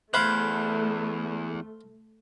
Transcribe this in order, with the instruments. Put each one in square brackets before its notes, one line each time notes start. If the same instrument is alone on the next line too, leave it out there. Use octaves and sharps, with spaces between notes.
[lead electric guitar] E2 [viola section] A3 [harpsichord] C5 F5 [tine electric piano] B5 F#6